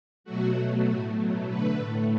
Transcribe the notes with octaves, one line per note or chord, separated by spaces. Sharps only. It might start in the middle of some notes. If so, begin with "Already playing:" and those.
B2 F#3 A3 F#4
B2 F#3 A3
A2 A3 F#4
B2 F#3 A3
D3 A3 B4
A2 A3